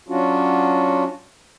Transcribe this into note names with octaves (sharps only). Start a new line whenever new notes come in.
F#3 C#4 D4 F4 F#4